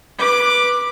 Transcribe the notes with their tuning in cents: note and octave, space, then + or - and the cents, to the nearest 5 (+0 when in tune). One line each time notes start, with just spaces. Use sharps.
B4 -10 D6 +10